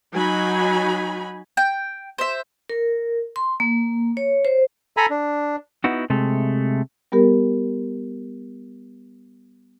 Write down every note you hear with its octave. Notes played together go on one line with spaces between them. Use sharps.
F#3 D#4 F#4 G#5 B5
G5
C5 E5
A#4
C6
A#3
C#5
C5
A4 G#5 A#5 B5
D4
B3 D#4 E4 F#4
C3 G#3 A3
G3 B3 G4 A#4